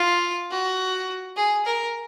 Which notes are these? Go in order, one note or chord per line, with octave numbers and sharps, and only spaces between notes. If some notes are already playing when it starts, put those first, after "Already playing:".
Already playing: F4
F#4
G#4
A#4